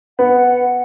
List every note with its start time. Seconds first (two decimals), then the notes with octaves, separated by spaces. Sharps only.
0.19 B3 F#5